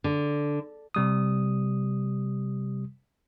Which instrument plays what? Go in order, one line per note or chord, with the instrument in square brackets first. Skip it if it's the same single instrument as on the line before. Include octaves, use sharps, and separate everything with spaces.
[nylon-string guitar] D3
[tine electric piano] C3 G3 D#6